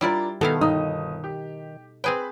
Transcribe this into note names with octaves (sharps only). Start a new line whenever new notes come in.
G3 D4 E4 F4 A#4 D5
B2 D#3 B3 E4 A4 F5
G1 D#4 D#6
G4
C4 G#4 B4 G5